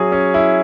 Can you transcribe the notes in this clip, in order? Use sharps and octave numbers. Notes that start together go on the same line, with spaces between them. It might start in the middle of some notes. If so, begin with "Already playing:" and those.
Already playing: F#3 C#4 E4 G#4
C#4
E4